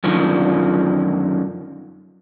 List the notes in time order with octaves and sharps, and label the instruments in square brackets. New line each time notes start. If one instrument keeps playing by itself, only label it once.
[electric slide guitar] F#2 D3 D#3 F3